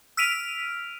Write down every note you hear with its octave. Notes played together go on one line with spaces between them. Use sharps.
E6 F6 B6 D7 D#7 F7